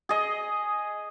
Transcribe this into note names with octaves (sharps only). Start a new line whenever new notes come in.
G#4 D#5